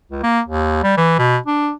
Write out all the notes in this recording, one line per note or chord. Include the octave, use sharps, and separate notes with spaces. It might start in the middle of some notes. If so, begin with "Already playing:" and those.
C#2
A#3
D#2
G3
E3
B2
D4